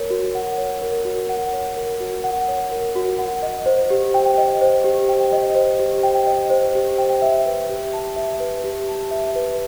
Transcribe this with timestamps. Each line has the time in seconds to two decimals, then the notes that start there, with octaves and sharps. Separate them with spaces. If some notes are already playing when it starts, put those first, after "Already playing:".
Already playing: A#4 C#5
0.10 F#4
0.35 F#5
0.58 C#5
0.82 A#4
1.05 F#4
1.29 F#5
1.53 C#5
1.77 A#4
2.00 F#4
2.24 F#5
2.48 C#5
2.72 A#4
2.96 F#4
3.19 F#5
3.43 D#5
3.66 C5
3.90 G4
4.14 G5
4.38 D#5
4.61 C5
4.84 G4
5.09 G5
5.33 D#5
5.55 C5
5.79 G4
6.03 G5
6.27 D#5
6.50 C5
6.75 G4
6.98 G5
7.22 E5
7.46 B4
7.69 G4
7.93 A5
8.16 E5
8.40 B4
8.64 G4
8.88 A5
9.11 E5
9.36 B4